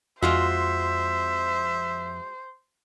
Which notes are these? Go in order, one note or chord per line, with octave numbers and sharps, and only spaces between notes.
F2 G#3 F4 F#4 C5 E5